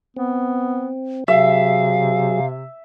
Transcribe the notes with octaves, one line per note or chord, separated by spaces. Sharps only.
B3 C4
C3 F#3 G#4 E5 F5